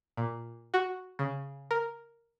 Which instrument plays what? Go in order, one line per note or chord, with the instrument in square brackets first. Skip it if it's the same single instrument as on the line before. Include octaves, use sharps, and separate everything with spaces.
[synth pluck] A#2
F#4
C#3
A#4